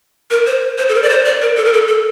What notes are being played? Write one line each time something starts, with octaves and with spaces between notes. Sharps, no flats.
A#4
C5
C5
A4
A#4
D5
C5
D5
A#4
A4
A#4
A4
A4